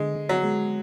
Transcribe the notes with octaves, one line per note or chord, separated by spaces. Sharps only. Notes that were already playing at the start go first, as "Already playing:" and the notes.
Already playing: D3 G#3
D3
F#3
G#3